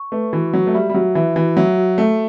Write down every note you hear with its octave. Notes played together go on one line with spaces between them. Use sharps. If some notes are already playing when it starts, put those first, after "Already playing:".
Already playing: C#6
A3 B4
E3 F#4
F#3 F#4
A3
G3 E5
G3
F#3 F#4
E3 E5
E3 F#4
F#3 E5
F#4
A3 E5